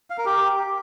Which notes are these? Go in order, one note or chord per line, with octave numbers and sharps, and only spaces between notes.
F5
A#4
G4